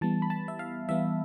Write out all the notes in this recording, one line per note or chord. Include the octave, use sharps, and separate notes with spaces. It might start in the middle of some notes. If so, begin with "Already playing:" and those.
E3 G3 B3 A5
B5
A5
E5
F5
E3 G3 B3 E5